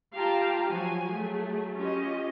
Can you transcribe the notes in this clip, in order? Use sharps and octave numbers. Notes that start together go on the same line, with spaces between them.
F4 G4 F5 G5 A5 A#5
F3 F#3 F#4 G#5
F#3 A3 G#4
C#4 F4 G4 D#5